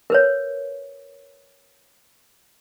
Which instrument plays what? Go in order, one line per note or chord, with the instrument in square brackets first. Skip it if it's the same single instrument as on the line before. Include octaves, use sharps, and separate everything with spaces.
[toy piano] A#4 B4 C#5